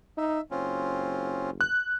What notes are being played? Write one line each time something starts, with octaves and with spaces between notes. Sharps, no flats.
D#4 E5
F#1 C4 C#4 F4
F#6